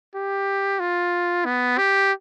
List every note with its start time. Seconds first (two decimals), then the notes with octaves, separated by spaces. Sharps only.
0.15 G4
0.80 F4
1.46 B3
1.78 G4